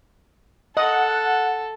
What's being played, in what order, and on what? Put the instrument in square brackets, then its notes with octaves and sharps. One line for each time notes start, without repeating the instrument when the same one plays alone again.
[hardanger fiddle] A4 [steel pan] D#5 [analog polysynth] F#5